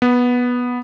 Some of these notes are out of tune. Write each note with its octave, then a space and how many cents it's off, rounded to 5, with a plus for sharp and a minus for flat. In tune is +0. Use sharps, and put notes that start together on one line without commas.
B3 -10